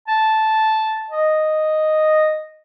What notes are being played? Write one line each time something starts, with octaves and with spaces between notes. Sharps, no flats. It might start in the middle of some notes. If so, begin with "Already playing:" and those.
A5
D#5